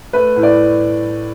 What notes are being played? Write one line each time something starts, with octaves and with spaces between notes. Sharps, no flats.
A3 B4
A2
D5